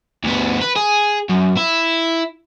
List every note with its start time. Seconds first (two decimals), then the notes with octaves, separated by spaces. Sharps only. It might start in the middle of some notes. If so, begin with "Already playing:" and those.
0.24 D2 B3
0.61 B4
0.76 G#4
1.30 F#2
1.58 E4